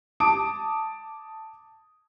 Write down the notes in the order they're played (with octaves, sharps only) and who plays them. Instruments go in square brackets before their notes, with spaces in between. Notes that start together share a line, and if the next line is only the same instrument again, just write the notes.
[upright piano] A5 D6 D#6 D7